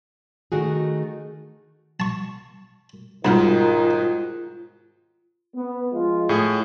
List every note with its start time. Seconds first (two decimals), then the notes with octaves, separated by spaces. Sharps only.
0.52 D#3 A3 F#4 G#4
2.00 A5 C#6
3.25 C2 G#2 B2 D#3 B3 F4 A#4
5.56 B3
5.93 F3 G#3 F4
6.29 A2 G#4